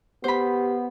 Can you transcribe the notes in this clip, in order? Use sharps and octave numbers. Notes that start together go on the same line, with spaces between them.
B3 G4 C5 B5